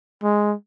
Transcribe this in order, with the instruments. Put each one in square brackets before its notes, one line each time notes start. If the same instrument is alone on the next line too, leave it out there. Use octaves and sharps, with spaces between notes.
[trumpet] G#3